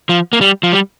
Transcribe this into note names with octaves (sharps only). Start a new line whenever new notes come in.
F3
A#3
G3
F3
G3